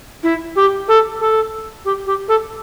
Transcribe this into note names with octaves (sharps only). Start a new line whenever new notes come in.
E4
G4
A4
A4
G4
G4
A4